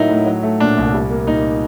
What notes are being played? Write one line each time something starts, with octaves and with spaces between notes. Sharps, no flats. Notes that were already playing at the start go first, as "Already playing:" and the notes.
Already playing: A2 F#3 A#3 D#4 E4
A2
F#3
A3
A#2 D4
C2
G3
A#3
A#2 D#4